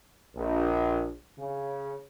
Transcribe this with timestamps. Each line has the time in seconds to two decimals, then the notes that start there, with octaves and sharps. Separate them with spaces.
0.35 A#1
1.37 C#3